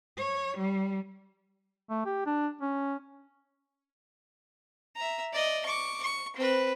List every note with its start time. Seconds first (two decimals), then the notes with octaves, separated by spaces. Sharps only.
0.17 C#5
0.58 G3
1.90 A3
2.06 G4
2.26 D4
2.61 C#4
4.96 E5 A#5
5.33 D5 D#5
5.66 C#6 D6
6.03 C#6
6.36 C4 B4